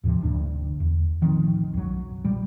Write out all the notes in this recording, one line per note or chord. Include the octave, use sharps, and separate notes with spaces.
D#2 A2 C3 F3
F#1 D2 D4
E2
A1 D#3 F3 C4
B1 F#2 F#3
A#2 G3